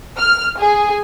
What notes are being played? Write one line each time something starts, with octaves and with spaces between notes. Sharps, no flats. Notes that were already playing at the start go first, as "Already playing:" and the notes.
F6
G#4